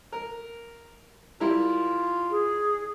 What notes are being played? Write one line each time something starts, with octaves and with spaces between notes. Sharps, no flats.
A#4
G3 E4 F4 A#4
G#4